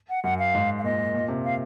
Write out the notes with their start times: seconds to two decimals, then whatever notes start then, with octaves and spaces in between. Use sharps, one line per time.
0.10 F#5
0.24 F#2 F#5
0.39 F5
0.55 G#2
0.79 F5
0.84 A#2 D#5
1.14 A#2
1.28 C3
1.45 F5